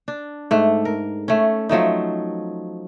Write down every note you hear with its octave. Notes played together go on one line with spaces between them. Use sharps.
D4
G#2 A3
A#4
A3 C#4
F3 F#3 A3 D#4